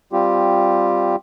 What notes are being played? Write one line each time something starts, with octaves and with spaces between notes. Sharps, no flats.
G3 C4 F4 G4